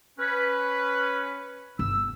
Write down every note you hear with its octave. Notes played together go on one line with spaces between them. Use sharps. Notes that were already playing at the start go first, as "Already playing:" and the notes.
C#4 B4
G1 E6